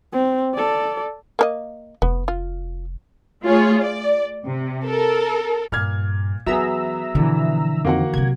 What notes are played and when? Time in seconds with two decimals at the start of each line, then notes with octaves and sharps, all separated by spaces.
0.12 C4
0.54 A4 D5
1.39 A#3 A#4 D#5
2.02 F1 B3
2.28 F4
3.43 A3 F4 G#4 C#5
3.82 D5
4.46 C3
4.85 A4 A#4
5.72 G2 A#2 F6 G#6
6.46 F#2 E3 F#3 B3 G#4 E5 A#5 E6
7.15 B2 D3 E3 F3
7.85 F2 D#3 A#3 C4 F#4 F#5
8.14 C3 F#3 G#6